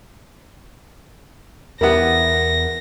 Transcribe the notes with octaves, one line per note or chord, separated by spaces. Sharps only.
E2 G3 B3 A#4 E5 F#5 A#6